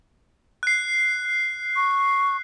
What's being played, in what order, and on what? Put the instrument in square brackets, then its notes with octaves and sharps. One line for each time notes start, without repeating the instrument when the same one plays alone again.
[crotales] F#6 C7
[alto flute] C#6